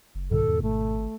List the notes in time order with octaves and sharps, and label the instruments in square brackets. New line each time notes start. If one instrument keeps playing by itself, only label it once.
[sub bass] F#1
[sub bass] C2 [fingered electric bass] G#2 B2 D#3 [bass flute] A4
[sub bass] E2
[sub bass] G#1 [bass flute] A3